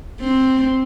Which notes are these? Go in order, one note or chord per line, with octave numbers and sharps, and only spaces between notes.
C4